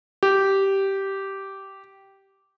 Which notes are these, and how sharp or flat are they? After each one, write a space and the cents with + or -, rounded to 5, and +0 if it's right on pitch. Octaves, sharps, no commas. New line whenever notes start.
G4 -10